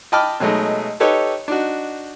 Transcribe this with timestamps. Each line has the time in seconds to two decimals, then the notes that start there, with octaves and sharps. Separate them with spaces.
0.12 D#5 G5 A5 B5 D6 F6
0.40 B2 F#3 G#3 A3 D#4
1.00 D#4 G4 A4 B4 C#5 D#5
1.48 D4 D#4 F#4